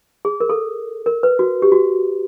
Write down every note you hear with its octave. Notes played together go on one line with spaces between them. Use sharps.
G#4
A#4
A4
A#4
B4
F#4
G4
F#4